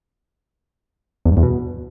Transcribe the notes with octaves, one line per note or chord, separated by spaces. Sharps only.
E2
G2
E2
B2